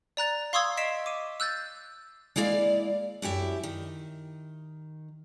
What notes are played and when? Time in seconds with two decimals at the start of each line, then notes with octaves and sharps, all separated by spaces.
0.17 D5 A#5 F#6 A6
0.53 F5 C6 C#6 D#6 E6 G#6
0.77 D#5 B6 C7 D7 E7
1.06 D6 D#7
1.40 E6 F#6 G6 A6
2.36 G#3 A#3 E4 D5 F5
3.22 F#2 E4 G4 E5
3.63 D#3